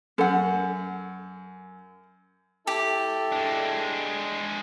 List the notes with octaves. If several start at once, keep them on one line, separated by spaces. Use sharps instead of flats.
F#2 A4 F#5
E4 G4 A4 A5
G#3 D4